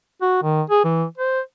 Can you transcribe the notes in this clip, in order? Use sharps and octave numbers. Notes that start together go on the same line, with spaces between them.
F#4
D#3
G#4
E3
C5